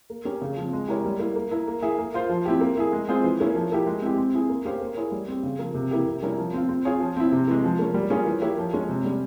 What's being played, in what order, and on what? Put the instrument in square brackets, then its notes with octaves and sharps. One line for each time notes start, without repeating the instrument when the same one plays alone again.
[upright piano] A#3
C#4 G4 A#4
C#3
F3 C4
G#3
E4 G4 A#4 C#5
G3
A#3 E4
A#3
E4 A#4
A#3
E4 G#4 E5
A#3
F4 C5 F5
F3
C4 E4 G4
A#3
E4 G#4
G#3
C4 F4 G#4 C5
E3
A#3 C#4 E4
F3
A#3 E4 G4
G#3
C4 E4 G4
C4
E4 G#4
A#3
C#4 G4 C5 F5
A#3
E4 G#4 C#5
G3
C4 G4
C#3
F3 A#3
C3
E3 A#3 E4 G4
C3
G3 C#4 E4 A#4
F3
C4 F4
C4
F4 G#4 C#5
F3
C4 E4
C3
E3 G#3
F3
A#3 C#4
G3
A#3 C#4 F4 G#4
E3
A#3 E4 G4 C#5
F3
G#3 C#4
C3
G3 C#4